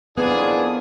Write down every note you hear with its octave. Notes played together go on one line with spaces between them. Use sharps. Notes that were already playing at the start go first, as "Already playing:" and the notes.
F2 A#3 B3 D4 E4 G#4